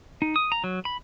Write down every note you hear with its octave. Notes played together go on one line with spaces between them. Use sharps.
D#4
D#6
A#5
F#3
B5